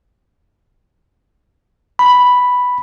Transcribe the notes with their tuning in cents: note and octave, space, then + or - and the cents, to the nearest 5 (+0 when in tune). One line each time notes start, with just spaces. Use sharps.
B5 +0